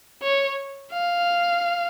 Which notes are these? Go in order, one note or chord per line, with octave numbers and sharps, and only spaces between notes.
C#5
F5